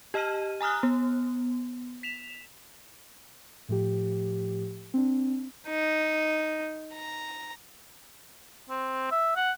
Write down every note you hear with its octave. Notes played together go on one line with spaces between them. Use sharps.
G4 D#5 A5 F6 D#7
G#5 A#5 D#6 F6 F#6
B3
B6 E7 F7
A2 F3 G4
C4 D4
D#4
A#5
C4
E5
F#5